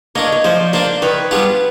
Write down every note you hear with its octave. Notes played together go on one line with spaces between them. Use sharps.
A#3 D4 C#5 D#5
C#5
F3 C5 D5
A#3 D4 C5 D5
D#3 B4 C#5
G3 B3 D4 F4